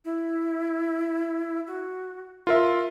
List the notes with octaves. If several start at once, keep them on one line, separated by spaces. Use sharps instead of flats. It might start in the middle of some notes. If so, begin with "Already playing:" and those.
E4
F#4
F4 A#4 E5 C6